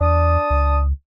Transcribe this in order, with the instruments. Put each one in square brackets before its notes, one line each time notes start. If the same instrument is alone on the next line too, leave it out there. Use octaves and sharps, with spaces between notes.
[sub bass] E2 [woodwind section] D4 A5 D#6
[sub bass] C#2